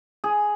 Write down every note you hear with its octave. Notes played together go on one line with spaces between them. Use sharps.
G#4